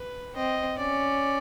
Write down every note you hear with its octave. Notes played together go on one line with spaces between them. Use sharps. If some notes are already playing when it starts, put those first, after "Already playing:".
Already playing: B4
C4 D#5
C#4 D5